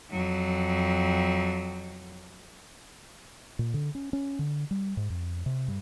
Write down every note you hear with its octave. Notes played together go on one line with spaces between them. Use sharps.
F2 F#3
A#2
D3
C#4
C#4
D3
G3
G#2
F2
C3
G2